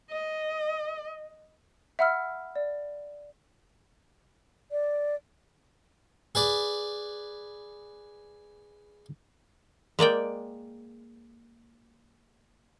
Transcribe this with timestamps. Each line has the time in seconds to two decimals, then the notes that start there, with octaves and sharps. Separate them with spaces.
0.10 D#5
1.99 E5 F#5 B5 E6 F6
2.56 D5
4.72 D5
6.35 G#4 B4 D5 B5
9.99 G#3 A#3 D5 G5